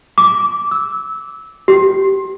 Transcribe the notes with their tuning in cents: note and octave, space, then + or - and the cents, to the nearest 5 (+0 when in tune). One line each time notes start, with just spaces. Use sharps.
D6 -15
E6 -20
G4 -20